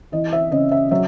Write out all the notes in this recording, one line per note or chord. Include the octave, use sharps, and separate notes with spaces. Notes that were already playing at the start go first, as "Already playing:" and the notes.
E3 D#5
E5
C#3 D#5
E5
F#3 E5